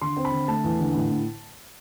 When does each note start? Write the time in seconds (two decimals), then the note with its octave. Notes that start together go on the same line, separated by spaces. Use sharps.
0.01 D3 C6
0.17 C4
0.25 B5
0.32 D3
0.48 A3 A5
0.64 E2
0.80 D3
0.95 A2
1.11 A2